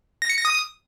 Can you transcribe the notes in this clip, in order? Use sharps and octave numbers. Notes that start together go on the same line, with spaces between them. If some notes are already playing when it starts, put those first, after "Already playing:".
A#6
C#7
A#6
D#6